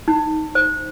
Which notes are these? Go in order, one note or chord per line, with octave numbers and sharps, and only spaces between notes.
D#4
C5